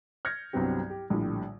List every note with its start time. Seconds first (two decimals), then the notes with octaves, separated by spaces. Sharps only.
0.25 F6 G6 G#6 A#6 C#7
0.53 C2 G2 F#3 B3 C4 G4
0.90 G4
1.10 A#1 A2 D3 G3